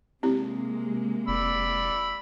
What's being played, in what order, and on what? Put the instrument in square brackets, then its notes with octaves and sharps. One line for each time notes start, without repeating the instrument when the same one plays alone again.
[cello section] C3 G#3 A#3 [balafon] C4 E4 G4
[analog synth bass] F1 [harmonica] D5 B5 E6